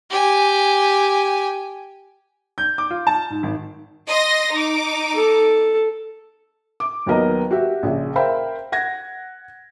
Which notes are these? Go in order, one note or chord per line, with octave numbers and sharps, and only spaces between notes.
G4 G#5
G6
D6
F4
A5
G#2
G#1
D#5 C6 A#6
D#4 D6
A4
D6
D#2 F#3 B3 A#4 D#5 A#5
F#4 G4 E5
A#1 C#3
A#4 C5 E5 F5 G5 B5
F#5 G#6 A#6